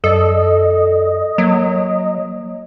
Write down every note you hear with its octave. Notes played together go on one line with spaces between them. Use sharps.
F#2 A4 D5 D#5
F#3 A#3